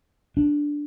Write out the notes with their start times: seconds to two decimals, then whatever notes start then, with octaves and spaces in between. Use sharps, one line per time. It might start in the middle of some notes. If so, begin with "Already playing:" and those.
0.37 D4